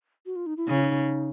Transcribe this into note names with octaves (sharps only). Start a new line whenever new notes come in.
F#4
F4
D#4
E4
C#3 D#4
E4
D#4